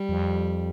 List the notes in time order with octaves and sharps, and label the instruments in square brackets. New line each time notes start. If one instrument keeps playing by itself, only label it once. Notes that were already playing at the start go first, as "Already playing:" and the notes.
Already playing: [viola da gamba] G3
[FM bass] F2